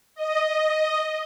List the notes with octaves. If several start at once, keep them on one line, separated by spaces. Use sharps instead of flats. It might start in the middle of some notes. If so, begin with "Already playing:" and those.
D#5